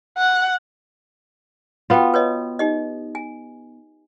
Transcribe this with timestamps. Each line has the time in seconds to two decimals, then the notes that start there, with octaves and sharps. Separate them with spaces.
0.18 F#5
1.90 B3 F4 F#4 G5
2.14 B4 C#5 D#5
2.59 D#4 G4 D#5
3.15 G#5